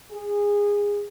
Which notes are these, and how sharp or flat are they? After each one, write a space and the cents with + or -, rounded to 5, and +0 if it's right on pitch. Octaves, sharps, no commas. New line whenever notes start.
G#4 -20